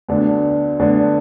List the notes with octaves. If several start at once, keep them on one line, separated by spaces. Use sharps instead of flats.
D2 D3 B3 D4
D2 D3 B3 D4